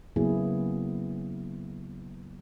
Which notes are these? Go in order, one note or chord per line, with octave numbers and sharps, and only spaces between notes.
C#3 F#3 A#3 B3 E4 G#4